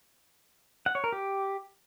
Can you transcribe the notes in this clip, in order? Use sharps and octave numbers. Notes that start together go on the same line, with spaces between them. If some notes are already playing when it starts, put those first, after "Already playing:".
F#5
C#5
A#4
G4